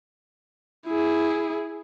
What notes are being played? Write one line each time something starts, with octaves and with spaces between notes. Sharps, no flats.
E4 G#4